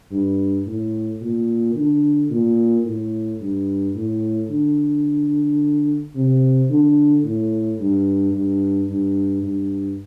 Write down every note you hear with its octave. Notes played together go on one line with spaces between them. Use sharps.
G2
A2
A#2
D3
A#2
A2
G2
A2
D3
C3
D3
A2
G2
G2
G2
G2